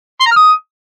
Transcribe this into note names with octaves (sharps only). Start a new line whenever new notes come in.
C6
A#5
F6
D#6